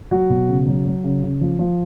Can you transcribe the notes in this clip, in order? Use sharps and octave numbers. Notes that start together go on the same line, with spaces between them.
F#3 F#4
B2
C#3
F#3
F#3
C#3
C#3
F3
F3